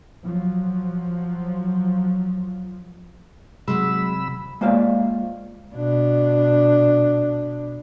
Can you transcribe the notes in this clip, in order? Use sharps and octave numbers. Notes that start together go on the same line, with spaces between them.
F3 F#3
C3 F#3 G#3 B5 E6
G#3 A#3 F4 C5 D5 F5
B2 D4